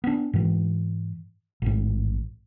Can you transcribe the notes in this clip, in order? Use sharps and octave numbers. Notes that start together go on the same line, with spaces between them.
B3 D4
G#2 E3
A1 G#2